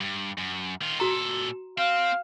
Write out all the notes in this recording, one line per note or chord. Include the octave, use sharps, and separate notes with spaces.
G2
F#2
D#3 F4
A#2 F#4 A4 A#5
C4 F5